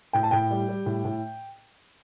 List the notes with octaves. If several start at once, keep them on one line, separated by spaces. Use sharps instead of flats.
A2 G5
A5
A2 G5
G3
G3
A2
A2